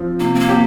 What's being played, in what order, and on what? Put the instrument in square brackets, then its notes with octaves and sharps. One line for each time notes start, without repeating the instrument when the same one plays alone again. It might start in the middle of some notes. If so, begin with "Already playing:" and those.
Already playing: [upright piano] F3 C4
[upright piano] C3 [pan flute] A#3
[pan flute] C4
A#3
[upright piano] G4